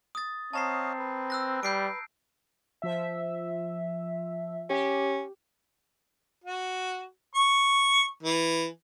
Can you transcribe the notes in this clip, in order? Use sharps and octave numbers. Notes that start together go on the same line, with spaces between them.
D#6 A6
C4 C#5 D#5 F5 A5 A#5 C7
B4
E6 F#6 A#6
G3 G6 C7 D7
F3 E5
C#4 G4
F#4
C#6
E3